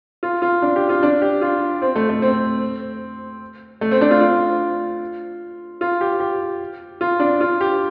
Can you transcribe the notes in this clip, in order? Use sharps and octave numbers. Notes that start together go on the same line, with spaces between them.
F4
F4
D4
G4
F4
D4
G4
F4
C4
A3
A3
C4
A3
C4
D4
F4
F4
F4
G4
G4
F4
D4
F4
G4